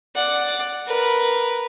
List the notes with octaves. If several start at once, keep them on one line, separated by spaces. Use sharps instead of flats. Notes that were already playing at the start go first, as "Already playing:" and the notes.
D5 F#5
A#4 B4